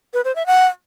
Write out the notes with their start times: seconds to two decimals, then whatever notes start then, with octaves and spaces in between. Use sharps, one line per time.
0.14 B4
0.24 C5
0.35 E5
0.46 F#5